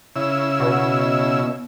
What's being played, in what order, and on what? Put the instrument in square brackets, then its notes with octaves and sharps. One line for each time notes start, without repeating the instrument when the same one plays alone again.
[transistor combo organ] C#3 E4 E6
[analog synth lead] B2